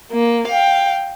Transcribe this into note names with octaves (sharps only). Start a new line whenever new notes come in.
A#3
F5 G5